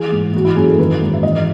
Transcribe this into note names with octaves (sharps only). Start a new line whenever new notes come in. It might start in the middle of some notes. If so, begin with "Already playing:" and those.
Already playing: E3 G#4
G#2
E3 F#4
E4
F#2 G#4
A4
D#3 B4
G#2
E5
E3 D#5